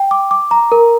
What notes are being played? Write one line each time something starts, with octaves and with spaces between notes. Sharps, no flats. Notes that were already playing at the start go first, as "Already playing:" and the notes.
Already playing: G5
D6
D6
A#5
A#4